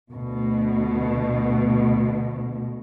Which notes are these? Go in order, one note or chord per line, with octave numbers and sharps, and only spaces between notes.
D2 B2